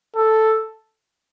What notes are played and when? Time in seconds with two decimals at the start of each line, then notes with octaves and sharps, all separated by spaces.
0.16 A4